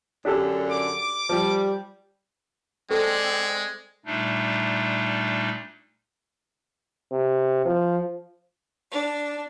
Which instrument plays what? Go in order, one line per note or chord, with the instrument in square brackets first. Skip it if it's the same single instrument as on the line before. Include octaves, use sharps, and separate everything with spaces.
[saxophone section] F#2 D3 [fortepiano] D4 G4 A4
[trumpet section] D6
[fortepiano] F3 [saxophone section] G3
[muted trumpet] G#3 [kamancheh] C4 D5 [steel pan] A4
[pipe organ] A#2 G3 A3 D4 D#4
[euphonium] C3
F3
[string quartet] D4